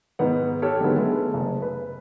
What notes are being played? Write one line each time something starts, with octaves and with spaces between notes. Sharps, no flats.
G#2 D#3 B3 F#5
G4 A4 C#5 F6
D3 D#3 F#3 G#3 B3
G#3 A3 B3
F#1
B4